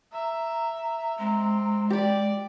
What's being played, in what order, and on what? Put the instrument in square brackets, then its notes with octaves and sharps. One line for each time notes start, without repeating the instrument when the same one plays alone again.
[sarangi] E5 [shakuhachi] A#5
[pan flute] G#3 [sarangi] C4
[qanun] G4 B5 [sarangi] D5